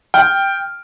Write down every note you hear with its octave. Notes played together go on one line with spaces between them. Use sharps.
G5 F6